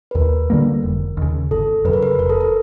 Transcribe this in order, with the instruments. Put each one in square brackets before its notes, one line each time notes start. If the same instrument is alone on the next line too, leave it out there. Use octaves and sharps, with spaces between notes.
[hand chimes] B4
[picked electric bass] D#2 [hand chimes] A#4
[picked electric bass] D3 G3 A#3
F1
D#2 C#3
[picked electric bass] G1 [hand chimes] A4
[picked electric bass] F#2 C#3 [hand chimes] B4
[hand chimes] A#4
B4
[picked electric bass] F1 [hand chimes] A#4
[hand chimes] A4
A#4